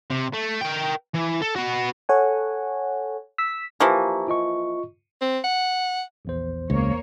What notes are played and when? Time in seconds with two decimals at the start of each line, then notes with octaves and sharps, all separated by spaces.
0.10 C3
0.34 A3
0.61 A#4 G5
1.14 E3
1.41 A4
1.56 B3 F#4
2.09 A4 C#5 F#5 G#5
3.38 E6 B6
3.80 E3 F3 A#3 G4 A#5 C#6
4.28 F4 D#5 C#6
5.21 C4
5.44 F#5
6.25 A#1 E2 C5
6.70 C#2 A#3 C#5